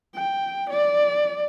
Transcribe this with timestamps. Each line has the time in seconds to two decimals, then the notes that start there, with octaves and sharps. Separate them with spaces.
0.15 G5
0.69 D5